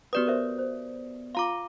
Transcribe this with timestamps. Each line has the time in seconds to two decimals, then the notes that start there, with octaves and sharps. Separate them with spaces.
0.13 B3 F#4 G4 B4 D5 D#6
0.27 A#4 C5 E5
0.58 C5
1.35 F4 F5 A#5 C6 D6